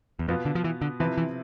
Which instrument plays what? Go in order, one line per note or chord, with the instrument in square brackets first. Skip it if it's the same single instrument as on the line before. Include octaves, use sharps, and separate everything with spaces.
[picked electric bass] E2
[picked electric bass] F2 [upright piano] B2 B3 F4
[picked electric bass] D3
F3
E3
D3
[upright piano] C3 F3 C4 E4 B4 [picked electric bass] E3
[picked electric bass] E3